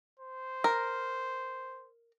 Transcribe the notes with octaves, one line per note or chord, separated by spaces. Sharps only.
C5
A#4